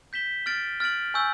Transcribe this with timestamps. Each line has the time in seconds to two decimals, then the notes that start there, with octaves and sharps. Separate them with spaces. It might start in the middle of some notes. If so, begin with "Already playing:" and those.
0.13 G6 B6 E7 G7
0.46 F6 A6 D7 F#7
0.80 F6 A6 D7 F#7
1.14 G#5 C#6 E6 G6